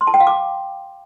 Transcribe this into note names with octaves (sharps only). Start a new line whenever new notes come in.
C6
A5
G5
F5
D6